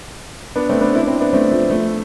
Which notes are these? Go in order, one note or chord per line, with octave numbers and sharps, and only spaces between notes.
B3 D4
A3 C4
B3 D4
C4 E4
D4
C4 E4
B3 D4
A3 C4
F3 A3
F3 A3